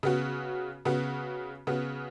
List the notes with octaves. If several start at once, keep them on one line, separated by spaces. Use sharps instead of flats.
C#3 B3 F#4
C#3 B3 F#4
C#3 B3 F#4